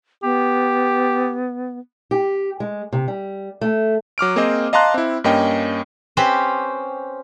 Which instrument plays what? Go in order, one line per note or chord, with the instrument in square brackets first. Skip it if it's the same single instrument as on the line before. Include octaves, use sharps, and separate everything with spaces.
[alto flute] B3 [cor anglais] G4
[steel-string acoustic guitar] G4
G#3
C3
G3
A3
[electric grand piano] F#3 D6 F6 D7
A#3 C4 G#4 C5 D#5
D#5 F5 A5 A#5 C6 F#6
C4 E4
G2 A#3 C#4 D#5 G5
[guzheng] C4 C#4 G4 B4 C5